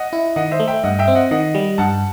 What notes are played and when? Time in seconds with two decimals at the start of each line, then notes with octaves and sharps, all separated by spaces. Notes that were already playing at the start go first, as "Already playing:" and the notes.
Already playing: D#5 F#5
0.13 E4
0.36 D#3 D#5 F#5
0.51 C5 E5
0.60 A3
0.67 E5 G5
0.84 G2 D#5 F#5
0.99 E5 G5
1.08 C4
1.15 D#5 F#5
1.31 D#3 D#5 F#5
1.55 G3
1.78 G2 F#5 A5